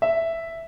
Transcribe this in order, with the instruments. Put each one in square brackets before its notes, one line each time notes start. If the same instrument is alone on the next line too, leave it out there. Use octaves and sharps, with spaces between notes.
[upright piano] E5